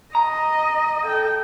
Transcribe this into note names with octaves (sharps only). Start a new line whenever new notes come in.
D#5 A#5
A4 G5